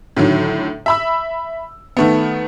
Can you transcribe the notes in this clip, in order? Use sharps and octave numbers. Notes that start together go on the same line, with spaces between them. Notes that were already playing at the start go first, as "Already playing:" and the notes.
A2 D3 D#3 F#3
E5 B5 E6
D#3 A3 B3